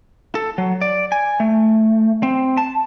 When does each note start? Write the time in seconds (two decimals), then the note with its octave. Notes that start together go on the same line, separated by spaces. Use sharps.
0.35 A4
0.58 F#3
0.82 D5
1.12 G#5
1.40 A3
2.23 C4
2.57 A5